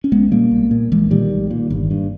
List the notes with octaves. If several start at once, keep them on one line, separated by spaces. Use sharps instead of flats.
C#4
B1 G#3 B3
A#2 G3 A#3
B1
A#2
B1 E3 G#3
A#2 D#3 G3
B1
A#2
G1
G2